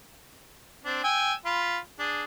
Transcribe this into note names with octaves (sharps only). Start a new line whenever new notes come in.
C4 D4
G5 G#5 E6
F4 B5
D4 G#4